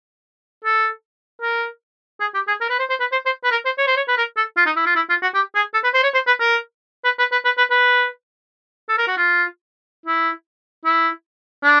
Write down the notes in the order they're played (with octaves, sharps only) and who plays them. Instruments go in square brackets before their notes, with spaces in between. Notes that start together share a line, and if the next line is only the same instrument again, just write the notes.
[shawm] A4
A#4
G#4
G4
G#4
A#4
B4
C5
C5
B4
C5
C5
B4
A#4
C5
C#5
C5
C#5
B4
A#4
A4
F4
D#4
E4
F4
E4
F4
F#4
G4
G#4
A4
B4
C5
C#5
C5
B4
A#4
B4
B4
B4
B4
B4
B4
A4
A#4
F#4
F4
E4
E4
D4